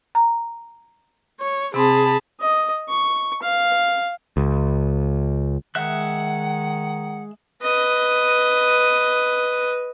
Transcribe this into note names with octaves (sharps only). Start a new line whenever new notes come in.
A#5
C#5
C3 C4 G#4 A5 B5
D#5
C#6
F5
C#2
D#3 G#3 E5 F#5 F#6
B4 D#5